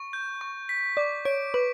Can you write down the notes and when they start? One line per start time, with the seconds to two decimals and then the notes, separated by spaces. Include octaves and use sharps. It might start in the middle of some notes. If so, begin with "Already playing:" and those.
Already playing: C#6
0.13 G6
0.41 C#6
0.69 B6
0.97 D5 D6
1.25 C#5 D7
1.54 B4 D6